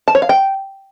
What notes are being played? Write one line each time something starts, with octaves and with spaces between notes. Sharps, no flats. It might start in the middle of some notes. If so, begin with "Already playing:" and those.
A5
C#5
F5
G5